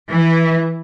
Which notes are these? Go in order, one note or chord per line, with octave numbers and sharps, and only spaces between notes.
E3 E4